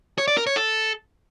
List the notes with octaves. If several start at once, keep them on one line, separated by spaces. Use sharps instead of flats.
C#5
D5
A#4
C#5
A4